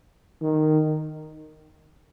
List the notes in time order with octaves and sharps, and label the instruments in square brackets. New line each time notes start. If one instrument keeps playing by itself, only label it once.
[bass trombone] D#3